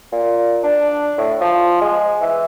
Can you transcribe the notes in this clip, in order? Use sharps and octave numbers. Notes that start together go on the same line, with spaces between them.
A#2
D4
A2
F3
G#3
E3